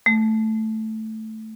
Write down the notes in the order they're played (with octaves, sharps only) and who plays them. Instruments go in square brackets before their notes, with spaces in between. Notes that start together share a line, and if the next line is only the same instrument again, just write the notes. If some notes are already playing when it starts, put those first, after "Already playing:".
[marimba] A3